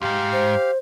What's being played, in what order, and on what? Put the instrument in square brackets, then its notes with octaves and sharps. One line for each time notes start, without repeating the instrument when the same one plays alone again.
[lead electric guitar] C#2 G#2 [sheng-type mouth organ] G4 F5
[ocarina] C5